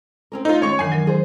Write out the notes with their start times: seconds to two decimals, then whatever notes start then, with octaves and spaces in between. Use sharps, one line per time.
0.32 C4 C#4 A#4
0.45 A3 D#4 F4 C6 E6
0.62 D#3 G#3 C#4 C#5 C#6
0.79 F#2 D#3 E3 D4 G#5 C7
0.92 F#3 A#4
1.07 G#4 C5